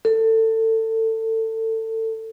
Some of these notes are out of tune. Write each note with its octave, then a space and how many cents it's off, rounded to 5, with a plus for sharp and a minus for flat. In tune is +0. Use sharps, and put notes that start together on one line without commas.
A4 +25